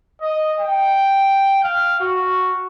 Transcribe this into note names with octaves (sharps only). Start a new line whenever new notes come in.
D#5
G5
F5
F#4